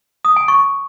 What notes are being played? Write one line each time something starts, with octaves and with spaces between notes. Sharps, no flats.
D#6
G#5
C#6